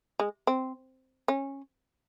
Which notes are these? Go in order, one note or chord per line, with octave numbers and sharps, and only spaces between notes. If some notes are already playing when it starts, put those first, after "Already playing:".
G#3
C4
C#4